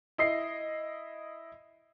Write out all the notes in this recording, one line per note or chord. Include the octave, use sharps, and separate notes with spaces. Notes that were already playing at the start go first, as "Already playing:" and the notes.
E4 D#5 C7